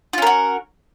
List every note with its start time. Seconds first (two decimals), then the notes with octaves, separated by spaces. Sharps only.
0.13 F4
0.18 C#4
0.22 A#4
0.27 F#4